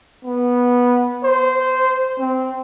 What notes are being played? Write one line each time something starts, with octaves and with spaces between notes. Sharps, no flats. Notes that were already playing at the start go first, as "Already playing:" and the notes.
B3
C5
C4